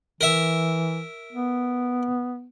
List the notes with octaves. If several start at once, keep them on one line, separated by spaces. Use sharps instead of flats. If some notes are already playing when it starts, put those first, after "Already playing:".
E3 A#4 E5
B3